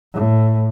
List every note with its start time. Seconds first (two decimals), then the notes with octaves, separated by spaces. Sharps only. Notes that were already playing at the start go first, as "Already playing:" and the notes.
0.13 A2